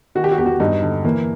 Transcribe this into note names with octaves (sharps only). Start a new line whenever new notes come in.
D#3 F#4
G4
F#4
E2 G4
F#4
G2 D#4
D3
E3 A#3